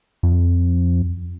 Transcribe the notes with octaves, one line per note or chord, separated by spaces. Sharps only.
F2